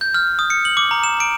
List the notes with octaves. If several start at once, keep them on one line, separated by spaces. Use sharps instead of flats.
G6
F6
D#6
C#7
F#7
D6
A#5
E7
D7